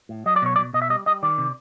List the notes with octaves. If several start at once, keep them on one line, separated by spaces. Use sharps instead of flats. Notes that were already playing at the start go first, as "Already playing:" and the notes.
A2
F#3 D#5
D5
B2 C#5
D5
B2
B2 D#5
E5
G3 D#5
G3 D#5
D#3 D5
C3